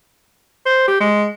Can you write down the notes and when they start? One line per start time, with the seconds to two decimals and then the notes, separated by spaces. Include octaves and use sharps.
0.66 C5
0.88 G4
1.00 G#3